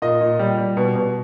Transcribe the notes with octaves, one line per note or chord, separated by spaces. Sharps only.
A#2 D#5
A#2
G3
G3
B2
B2